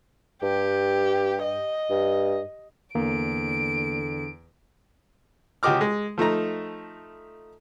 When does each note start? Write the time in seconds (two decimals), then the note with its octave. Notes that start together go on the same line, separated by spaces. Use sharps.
0.43 G2 G4
1.43 D#5
1.90 G2
2.95 E2 D3 A#3 D7
5.63 C#2 F#4 G4 D#5 D6 F6
5.81 G#3
6.18 F3 A3 D#4 A#5